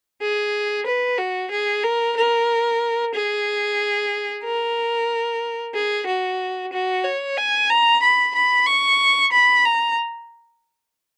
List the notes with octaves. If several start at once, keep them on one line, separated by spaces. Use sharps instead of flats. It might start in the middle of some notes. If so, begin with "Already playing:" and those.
G#4
B4
F#4
G#4
A#4
A#4
G#4
A#4
G#4
F#4
F#4
C#5
G#5
A#5
B5
B5
C#6
B5
A#5